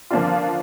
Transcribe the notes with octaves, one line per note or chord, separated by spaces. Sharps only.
D3 F3 A#3 D4 F4